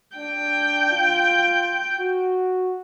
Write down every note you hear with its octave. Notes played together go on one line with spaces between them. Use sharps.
D4 G5
F4
F#4